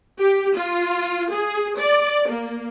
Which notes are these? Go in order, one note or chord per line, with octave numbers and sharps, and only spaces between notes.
G4
F4
G#4
D5
A#3